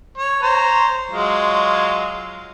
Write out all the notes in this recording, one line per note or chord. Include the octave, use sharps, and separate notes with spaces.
C#5
C5 C#5 A#5
F#3 G#3 F4